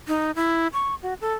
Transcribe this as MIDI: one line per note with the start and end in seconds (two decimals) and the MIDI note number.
0.08 0.31 63
0.36 0.67 64
0.73 0.95 85
1.02 1.14 66
1.21 1.34 69